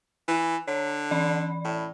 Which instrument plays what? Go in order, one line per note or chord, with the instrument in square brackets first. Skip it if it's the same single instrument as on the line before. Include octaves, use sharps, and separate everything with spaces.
[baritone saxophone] E3
[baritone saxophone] D3 [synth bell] C#5
[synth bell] E3 D5 B5
[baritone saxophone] A2